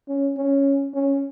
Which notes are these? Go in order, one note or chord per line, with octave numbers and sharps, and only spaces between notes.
C#4
C#4
C#4